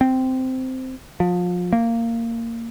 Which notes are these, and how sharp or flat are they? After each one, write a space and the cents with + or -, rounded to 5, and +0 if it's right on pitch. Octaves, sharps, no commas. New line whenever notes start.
C4 -10
F3 +30
A#3 -15